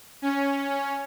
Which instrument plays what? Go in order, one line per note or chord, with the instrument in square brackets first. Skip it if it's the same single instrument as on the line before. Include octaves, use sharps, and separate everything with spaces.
[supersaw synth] C#4
C#4